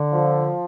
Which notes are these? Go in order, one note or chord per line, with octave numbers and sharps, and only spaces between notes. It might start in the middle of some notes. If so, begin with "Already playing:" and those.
Already playing: D3
F3